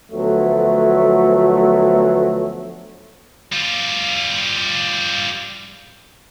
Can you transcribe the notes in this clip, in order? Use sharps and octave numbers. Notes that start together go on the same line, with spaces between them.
D2 F3 F#3 A3 B3
G3 F4